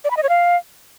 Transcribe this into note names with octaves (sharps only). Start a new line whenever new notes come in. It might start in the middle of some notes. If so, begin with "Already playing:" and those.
D5
B5
D#5
C#5
F5